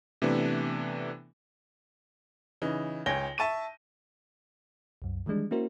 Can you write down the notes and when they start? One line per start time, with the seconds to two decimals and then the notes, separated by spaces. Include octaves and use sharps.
0.22 C3 E3 A3 B3 D4
2.62 C#3 E3 D#4
3.06 C#2 C#5 G5 G#5 A#6 G7
3.38 E5 A5 C#6 D#7
5.02 C2 F#2
5.26 D#3 E3 G3 G#3 D4
5.51 A#3 C#4 E4 F#4 A#4 C5